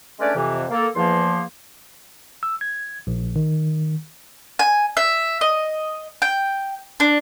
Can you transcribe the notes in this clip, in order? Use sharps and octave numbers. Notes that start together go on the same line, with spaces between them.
G#3 A3 C#4 D4 B4 D5
F2 C3 E3
A#3 A4
E2 F3 A#3 C6
E6
G#6
A#1
D#3
G#5
E5
D#5
G5
D4